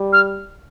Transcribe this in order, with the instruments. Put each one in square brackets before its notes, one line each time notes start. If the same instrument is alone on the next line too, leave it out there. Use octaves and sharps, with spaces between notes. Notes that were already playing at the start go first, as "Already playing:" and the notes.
Already playing: [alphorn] G3
[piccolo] F6